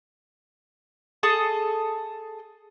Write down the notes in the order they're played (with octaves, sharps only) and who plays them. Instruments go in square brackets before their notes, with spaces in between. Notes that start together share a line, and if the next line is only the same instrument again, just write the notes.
[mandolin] G#4 A4 A5 D#6